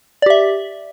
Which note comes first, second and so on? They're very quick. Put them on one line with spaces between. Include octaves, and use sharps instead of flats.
D5 G4 E5